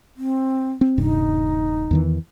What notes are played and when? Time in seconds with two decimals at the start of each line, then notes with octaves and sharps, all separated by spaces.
0.17 C4
0.81 C4
0.98 D#1 G2 C3 D#4
1.91 E2 D#3 E3